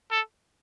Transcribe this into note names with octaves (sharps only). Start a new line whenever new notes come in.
A4